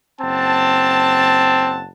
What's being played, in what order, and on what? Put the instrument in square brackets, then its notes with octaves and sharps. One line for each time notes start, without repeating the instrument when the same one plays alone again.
[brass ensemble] F#1 F#5 A5 [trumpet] C4